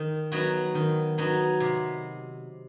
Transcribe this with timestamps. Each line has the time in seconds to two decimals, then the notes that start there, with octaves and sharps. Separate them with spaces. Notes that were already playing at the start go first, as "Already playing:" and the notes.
Already playing: D#3
0.32 F#3 B3 D#4 F#4
0.75 D#3
1.18 F#3 B3 D#4 F#4
1.60 C3